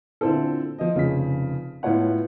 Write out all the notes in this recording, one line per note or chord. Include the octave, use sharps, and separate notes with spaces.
A#2 D3 C4 E4 A4
F3 D#5
F1 C#3 F3 B6
A2 B3 F4 C#5 F#5